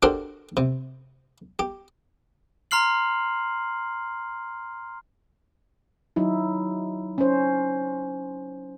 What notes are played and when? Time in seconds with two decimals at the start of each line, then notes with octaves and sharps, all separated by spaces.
0.02 D4 F#4 G4 A4 A#4 C5
0.57 C3
1.59 G4
2.71 A#5 C6 F6 C7 F#7
6.16 F#3 D#4 E4
7.18 C#4 C5